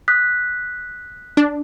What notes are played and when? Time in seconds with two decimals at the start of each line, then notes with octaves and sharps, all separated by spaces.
0.08 D#6 F#6 B6
1.37 D4